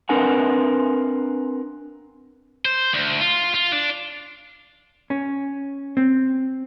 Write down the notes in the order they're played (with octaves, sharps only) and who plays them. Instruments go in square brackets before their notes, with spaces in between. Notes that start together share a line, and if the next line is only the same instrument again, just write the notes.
[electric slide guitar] C4 D4 A#4 B4 F#5 G#5
[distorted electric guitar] C5
D2
F4
F4
D4
[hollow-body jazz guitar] C#4
C4